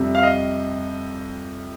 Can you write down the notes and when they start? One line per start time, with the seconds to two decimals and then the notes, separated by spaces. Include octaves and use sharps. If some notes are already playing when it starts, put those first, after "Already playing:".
Already playing: F2 C3 G3
0.15 F5
0.23 D#5